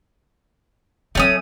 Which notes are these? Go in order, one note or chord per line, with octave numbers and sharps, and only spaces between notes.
F#3 A3 C4 C#4 D#6